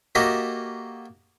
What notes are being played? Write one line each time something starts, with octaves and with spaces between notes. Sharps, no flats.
A#3 F#4 G4 A4 D#5 E5